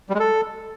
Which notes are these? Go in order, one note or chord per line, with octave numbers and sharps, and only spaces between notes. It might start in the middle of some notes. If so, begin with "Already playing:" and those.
G3
G#3
A4